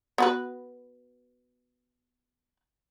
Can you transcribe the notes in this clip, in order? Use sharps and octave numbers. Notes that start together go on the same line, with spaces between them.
B3 F#4 B4